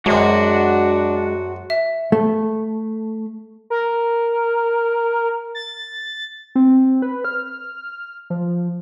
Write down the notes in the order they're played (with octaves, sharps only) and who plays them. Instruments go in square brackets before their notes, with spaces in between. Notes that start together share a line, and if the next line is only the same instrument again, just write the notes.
[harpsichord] F#2 C4 [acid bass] G#3 [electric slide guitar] D4 [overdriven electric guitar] F#4
[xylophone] E5
[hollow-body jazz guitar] A3
[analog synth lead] A#4
A6
C4
B4
F6
F3